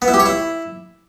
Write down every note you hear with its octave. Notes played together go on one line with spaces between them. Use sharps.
B3
E4
G4
C#5
E4